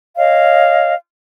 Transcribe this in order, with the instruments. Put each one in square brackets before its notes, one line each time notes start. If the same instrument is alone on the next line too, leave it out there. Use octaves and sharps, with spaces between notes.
[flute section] C#5 D#5 F5